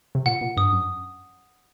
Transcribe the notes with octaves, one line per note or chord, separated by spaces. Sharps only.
C3
A#2 F#5
A#2
G2 D#6
F#2